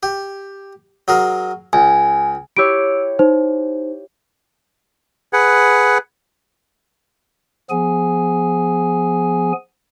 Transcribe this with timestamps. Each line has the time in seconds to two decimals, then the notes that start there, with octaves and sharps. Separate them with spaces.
0.03 G4
1.08 F#3 G#4 A#4
1.73 C#2 G#5
2.57 E4 G4 C#5 E6 D7
3.19 D#4 C5
5.33 G#4 B4 F#5
7.70 F3 B3 G#4 G#5